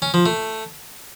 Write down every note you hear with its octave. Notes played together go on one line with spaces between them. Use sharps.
C#4
F3
A3